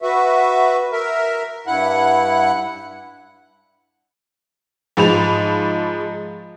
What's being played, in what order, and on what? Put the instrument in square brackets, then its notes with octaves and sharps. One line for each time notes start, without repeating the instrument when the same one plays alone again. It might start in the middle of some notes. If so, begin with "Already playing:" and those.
[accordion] F#4 B4 E5
A#4 E5
G2 E4 F#5 F#6
[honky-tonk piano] G#2 F3 B5 F7